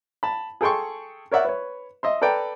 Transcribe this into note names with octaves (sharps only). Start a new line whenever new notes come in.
A5 B5
G#4 A4 G5 C6 C#6
A#4 C#5 D5 E5 F#5
B4 C#5
D#5 E5 C6
A4 B4 D5 G5 A#5